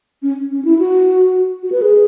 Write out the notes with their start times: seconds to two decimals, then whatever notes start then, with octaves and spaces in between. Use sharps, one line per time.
0.22 C#4
0.51 C#4
0.65 E4
0.79 F#4
1.63 F#4
1.72 B4
1.82 G#4